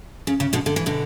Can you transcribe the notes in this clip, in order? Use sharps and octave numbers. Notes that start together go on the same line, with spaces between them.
C#3
C#3
B2 D3
D3
E3
B2 D3